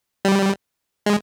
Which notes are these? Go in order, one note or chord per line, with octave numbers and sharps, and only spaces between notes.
G3
G#3